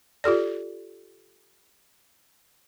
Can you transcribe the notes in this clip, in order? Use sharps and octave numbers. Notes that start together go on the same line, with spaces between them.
F4 G4 A4 D5